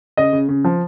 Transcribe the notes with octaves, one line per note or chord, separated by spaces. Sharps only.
C#3 D#5
C#3
C#3
F3